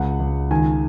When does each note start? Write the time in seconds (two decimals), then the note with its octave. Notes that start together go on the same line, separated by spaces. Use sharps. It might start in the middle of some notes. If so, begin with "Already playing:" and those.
Already playing: C#2 F#5
0.20 C#2
0.51 D#3 G#5